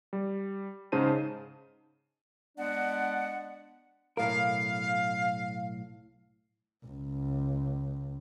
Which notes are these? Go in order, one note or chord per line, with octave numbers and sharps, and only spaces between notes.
G3
G#2 C#3 D#4 C5 A5 D#7
G#3 B3 D4 D5 F#5
B1 A2 A#4 F5
C#2